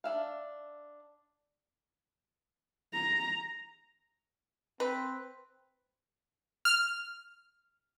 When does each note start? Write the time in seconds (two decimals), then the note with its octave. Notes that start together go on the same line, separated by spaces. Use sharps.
0.04 D4 E5 F5
2.94 A#5
4.80 C4 B4
6.65 F6